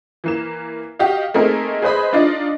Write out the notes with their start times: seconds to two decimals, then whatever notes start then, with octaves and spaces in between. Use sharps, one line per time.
0.24 E3 A#3 E7
0.99 F#4 G4 D#5 F5
1.34 A3 A#3 C4 D#4 G#4 A#4
1.82 G#4 B4 C5 D#5 B5
2.13 D4 D#4 F4 D5 D#5